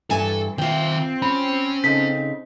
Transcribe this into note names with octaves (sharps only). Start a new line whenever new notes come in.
G2 E3 A4 G#5
D#3 C4 F4 E5 G5
C#4 B5
C#3 D#4 A4 B6